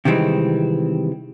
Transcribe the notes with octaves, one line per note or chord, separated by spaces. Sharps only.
C3 D#3 E3 G3 G#3 C4